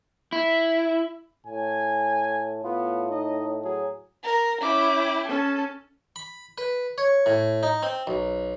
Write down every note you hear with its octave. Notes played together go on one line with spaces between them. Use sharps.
E4
A2 G#5
A2 B3 F4
D#4 D#5
F#3 G#4
A#4
C#4 E4 G5 D6
C#4 A4 A5
B5
B4
C#5
A2
D#4
C4
B1